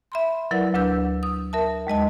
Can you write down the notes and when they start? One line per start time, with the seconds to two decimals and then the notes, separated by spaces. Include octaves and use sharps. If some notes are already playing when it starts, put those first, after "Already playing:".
0.12 E5 B5 C6
0.51 F#3 E4 A#4 B4 D5 F#5
0.74 D2 F#3 D4 B4 E6 G6
1.23 D#6
1.53 A#4 E5 A5
1.87 D#2 G#3 D#5 A5